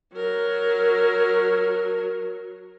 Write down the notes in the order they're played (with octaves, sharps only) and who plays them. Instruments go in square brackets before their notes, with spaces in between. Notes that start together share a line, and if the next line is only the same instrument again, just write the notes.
[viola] F#3 A#4